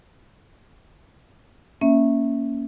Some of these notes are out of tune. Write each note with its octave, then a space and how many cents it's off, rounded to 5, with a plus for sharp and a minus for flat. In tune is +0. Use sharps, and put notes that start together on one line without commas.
A#3 +0 C#4 +0 E5 +0